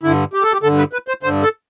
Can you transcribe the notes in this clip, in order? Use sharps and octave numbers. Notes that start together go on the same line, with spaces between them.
G2 D3 E4
G4
A4
G4
G2 D3 A4
B4
B4
C5
G2 D3 C5
A4